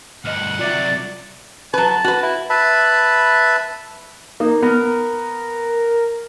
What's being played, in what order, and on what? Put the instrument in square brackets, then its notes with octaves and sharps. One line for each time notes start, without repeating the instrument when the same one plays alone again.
[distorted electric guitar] D2 G2 [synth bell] D#5 F6 [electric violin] F#5
[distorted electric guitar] C3 F#3 [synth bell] F4 E5 [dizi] D5
[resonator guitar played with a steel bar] F#3 B4 [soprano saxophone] A5
[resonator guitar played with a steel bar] F#4 B4
[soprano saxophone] E4
[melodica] B4 E5 A5 B5
[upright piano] A#3 [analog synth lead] D#4
[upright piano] B3 [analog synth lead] A#4